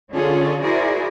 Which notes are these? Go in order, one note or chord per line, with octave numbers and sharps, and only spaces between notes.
D3 C#4 F4 G#4 A4 C#5
E4 F#4 G#4 A#4 C5 D5